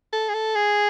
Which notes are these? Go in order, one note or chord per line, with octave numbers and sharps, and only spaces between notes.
A4
G#4
A4
G#4